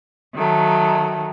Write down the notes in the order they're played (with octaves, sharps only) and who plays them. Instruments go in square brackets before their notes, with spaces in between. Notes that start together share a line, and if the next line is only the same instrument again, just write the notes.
[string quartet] D#3 F#3 A3